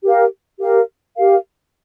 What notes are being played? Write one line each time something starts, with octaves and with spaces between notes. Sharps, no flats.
G4 A#4 F5
G4 A#4 F5
G4 A#4 F5